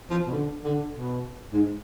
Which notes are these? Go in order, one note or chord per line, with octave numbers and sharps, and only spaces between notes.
F3
B2
D3
D3
B2
G#2